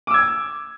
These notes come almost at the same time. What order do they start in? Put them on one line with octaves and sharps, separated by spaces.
D6 E6 G#6